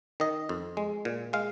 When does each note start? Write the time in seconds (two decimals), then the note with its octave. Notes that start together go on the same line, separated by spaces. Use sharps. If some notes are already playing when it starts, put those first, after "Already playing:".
0.20 D#3 D#5
0.49 F2
0.77 G#3
1.05 A#2
1.33 G#3 F5